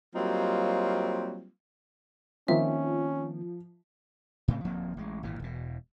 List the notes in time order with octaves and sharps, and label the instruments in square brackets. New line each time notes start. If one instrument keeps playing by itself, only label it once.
[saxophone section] F#3 G3 A#3 C4 D#4 F4
[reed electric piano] D#3 A#3 C4 [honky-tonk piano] F3 [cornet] C#4 [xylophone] E5
[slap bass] A2 C#3 A3 C4
D1 F3 A#3 C4
A1 G#3
G#1 A#2 E3
E1 B2